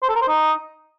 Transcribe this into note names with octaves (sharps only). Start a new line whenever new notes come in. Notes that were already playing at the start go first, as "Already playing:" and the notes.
C5
A4
A#4
C5
D#4